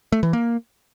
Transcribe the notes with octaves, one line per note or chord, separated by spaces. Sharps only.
A3
E3
A#3